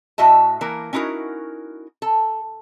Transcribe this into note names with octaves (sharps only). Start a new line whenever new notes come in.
A2 F#4 D#5 E5 A5
E3 A#3 A#4
C#4 D#4 E4 F#4 A#4
A4